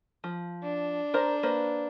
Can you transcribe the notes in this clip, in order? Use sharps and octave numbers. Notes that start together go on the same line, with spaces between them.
F3
D4
A#4 C5 A#5
A#3 B4 C5